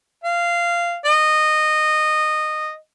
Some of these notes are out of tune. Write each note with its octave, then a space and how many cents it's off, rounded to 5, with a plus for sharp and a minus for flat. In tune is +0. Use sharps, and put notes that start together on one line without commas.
F5 -15
D#5 -15